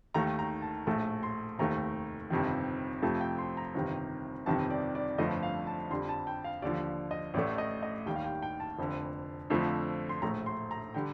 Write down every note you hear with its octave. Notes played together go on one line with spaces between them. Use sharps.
D#2 D#3 A3 A#5
A#5
A5
A#1 A2 A3 A5
C6
F1 D#2 D#3 A3 A#5
G1 F2 C3 D#3
F2 C3 F3 A3 A5
G5
C6
A#5
G1 F2 C3 D#3
G1 F2 C3 D#3 A5
D5
D5
G1 F2 D3 F3 A3 D#5
F5
A5
F2 D3 G3 C6
A5
G5
F5
D#2 D3 F3 D5
D#5
A1 A2 A3 D5
D#5
D#5
D#2 D#3 G3 G5
F5
G5
G5
A5
F1 F2 D3
F2 D3 F3 A3
C6
A#1 A2 A3 A#5
C6
A#5
D3 G3 G5